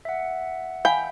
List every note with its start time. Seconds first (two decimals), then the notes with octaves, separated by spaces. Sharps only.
0.05 E5 F#5
0.85 F5 G5 G#5 B5